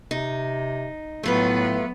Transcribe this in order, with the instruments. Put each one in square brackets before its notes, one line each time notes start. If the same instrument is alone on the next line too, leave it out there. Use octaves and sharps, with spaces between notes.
[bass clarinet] C3 [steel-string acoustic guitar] D#4
[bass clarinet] A2 [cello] F#3 B3 [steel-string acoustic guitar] A3 F4 B4